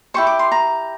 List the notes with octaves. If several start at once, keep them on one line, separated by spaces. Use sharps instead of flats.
E4 G4 C5 C#6
D6
C6
A#5